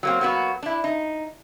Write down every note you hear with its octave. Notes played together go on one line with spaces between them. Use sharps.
F#3 A#3 C4
F#3 A#3 B3 F#4
D4 E4
D#4